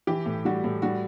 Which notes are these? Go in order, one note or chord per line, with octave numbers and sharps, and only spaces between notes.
E3 G4
A2
G3 F#4
A2
G3 F#4